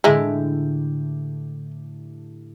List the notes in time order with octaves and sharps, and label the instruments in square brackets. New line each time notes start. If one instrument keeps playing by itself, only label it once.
[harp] A2 D3 G4 [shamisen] G#3 E4